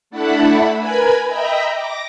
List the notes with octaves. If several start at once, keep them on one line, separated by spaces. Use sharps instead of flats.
A3 D4 E4 F#5 A5 B5
A#4 B4 G#5 B5 G#6
D#5 E5 G5 A#5 B5
D6 A#6